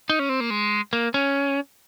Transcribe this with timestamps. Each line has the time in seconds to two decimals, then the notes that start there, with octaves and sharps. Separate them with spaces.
0.09 D#4
0.19 C#4
0.29 C4
0.40 A#3
0.50 G#3
0.93 A#3
1.14 C#4